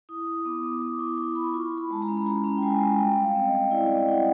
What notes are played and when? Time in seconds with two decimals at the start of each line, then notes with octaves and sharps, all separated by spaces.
0.09 E4 D#6
0.27 E4 D#6
0.45 B3 D6
0.63 B3 D#6
0.82 B3 D6
0.99 E4 C#6
1.18 E4 C#6
1.35 E4 B5
1.54 F4
1.68 F4 C6
1.78 B5
1.91 G#3 A5
2.02 A#5
2.08 C#4
2.17 B5
2.26 F4 A#5
2.44 C#4
2.57 G5
2.63 G#3 G#5
2.81 G#3
2.99 G3 G5
3.17 G3
3.23 F5
3.35 C4
3.47 D#5
3.54 G3
3.71 E4 D5
3.87 G3 D5
3.96 D#5
4.08 E4 F#5